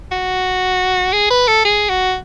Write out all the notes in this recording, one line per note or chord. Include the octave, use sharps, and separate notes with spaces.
F#4
G#4
B4
A4
G#4
F#4